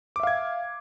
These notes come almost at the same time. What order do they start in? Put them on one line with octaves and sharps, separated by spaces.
D6 E5 F5 G#6